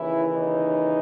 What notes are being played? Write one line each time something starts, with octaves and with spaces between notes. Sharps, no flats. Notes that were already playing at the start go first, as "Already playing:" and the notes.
Already playing: D#2 C#3 E3 E4
D#4